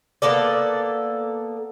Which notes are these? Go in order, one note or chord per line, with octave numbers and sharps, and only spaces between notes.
A#3 B3 A4 D5